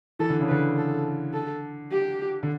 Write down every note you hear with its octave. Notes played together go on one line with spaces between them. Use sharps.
E3 A4
D3
C#3
D3 B4
A4
A4
G4
D3